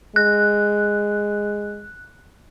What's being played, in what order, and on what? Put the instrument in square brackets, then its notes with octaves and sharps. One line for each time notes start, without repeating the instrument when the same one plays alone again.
[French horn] G#3 [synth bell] F#6